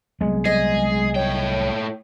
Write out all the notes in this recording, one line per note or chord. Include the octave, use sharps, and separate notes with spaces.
C2 F#3 G#3 B3
G#4 D#5
A2 C#5 G5